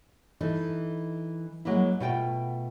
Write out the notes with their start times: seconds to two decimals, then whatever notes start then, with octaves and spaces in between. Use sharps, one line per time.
0.41 E3 D#4 A4
1.65 F#3 G#3 A#3 E4
2.00 B2 A3 F4 G5